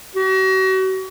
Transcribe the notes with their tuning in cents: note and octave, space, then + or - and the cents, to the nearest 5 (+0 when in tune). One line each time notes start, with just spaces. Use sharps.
F#4 +40